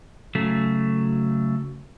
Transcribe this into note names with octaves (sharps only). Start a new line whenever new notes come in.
C#3 F#3 A3